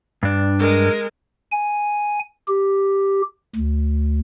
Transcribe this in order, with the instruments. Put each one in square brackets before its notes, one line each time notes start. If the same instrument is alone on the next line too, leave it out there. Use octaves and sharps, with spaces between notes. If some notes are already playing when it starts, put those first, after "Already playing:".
[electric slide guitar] G2 D4
[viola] G#3 A#4
[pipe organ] G#5
G4
D2